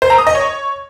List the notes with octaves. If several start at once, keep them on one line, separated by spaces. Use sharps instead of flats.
C5
A#5
D#6
D#5
C#5